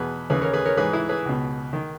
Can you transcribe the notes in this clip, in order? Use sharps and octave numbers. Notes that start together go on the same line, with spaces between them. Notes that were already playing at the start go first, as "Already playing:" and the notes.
Already playing: E2 B2 G#4 B4
D#2 C#3 E3 G#4 B4
A#4 C#5
G#4 B4
A#4 C#5
G#2 E3 G#4 B4
E4 G#4
G#4 B4
C#2 B2
D#3